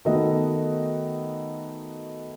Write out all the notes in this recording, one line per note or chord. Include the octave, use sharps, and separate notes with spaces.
D#3 A3 B3 F#4 D#5